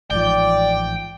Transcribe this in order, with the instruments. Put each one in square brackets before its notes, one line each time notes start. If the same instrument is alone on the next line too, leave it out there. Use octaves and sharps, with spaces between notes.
[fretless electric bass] A1 G#2 F3 [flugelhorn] D5 [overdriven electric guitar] G5